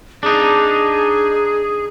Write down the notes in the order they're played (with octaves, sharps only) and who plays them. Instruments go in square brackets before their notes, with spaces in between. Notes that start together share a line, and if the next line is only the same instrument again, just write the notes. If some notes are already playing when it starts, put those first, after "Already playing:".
[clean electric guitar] D4 D#4 [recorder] G#4